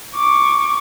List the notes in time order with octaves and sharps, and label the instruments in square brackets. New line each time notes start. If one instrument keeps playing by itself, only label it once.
[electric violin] C#6 D6